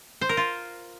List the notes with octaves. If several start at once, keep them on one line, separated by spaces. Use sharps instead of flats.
C5
A#4
F4